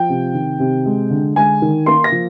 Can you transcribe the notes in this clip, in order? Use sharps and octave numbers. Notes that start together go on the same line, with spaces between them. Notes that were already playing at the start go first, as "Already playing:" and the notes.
Already playing: F3 G5
C3
D#3
C3
G#3
D3
G#3 G#5
D#3
A#3 C6
A#6
F3